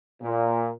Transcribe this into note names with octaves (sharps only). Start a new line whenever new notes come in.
A#2